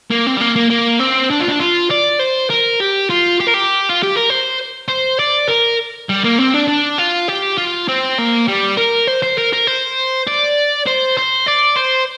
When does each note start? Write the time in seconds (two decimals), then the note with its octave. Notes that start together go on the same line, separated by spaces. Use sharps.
0.10 A#3
0.26 C4
0.37 G3
0.41 A#3
0.56 A#3
0.70 A#3
1.00 C4
1.31 D4
1.40 F4
1.49 D4
1.60 F4
1.91 D5
2.20 C5
2.50 A#4
2.80 G4
3.10 F4
3.40 G4
3.47 A#4
3.54 G4
3.89 F4
4.03 G4
4.16 A#4
4.30 C5
4.89 C5
5.19 D5
5.49 A#4
6.09 G3
6.24 A#3
6.39 C4
6.54 D4
6.68 D4
6.98 F4
7.28 G4
7.57 F4
7.88 C4
8.18 A#3
8.47 G3
8.77 A#4
9.07 C5
9.23 C5
9.38 A#4
9.53 A#4
9.67 C5
10.27 D5
10.86 C5
11.17 C5
11.47 D5
11.76 C5